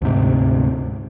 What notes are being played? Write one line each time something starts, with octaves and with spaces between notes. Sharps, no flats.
D2 G#2 C3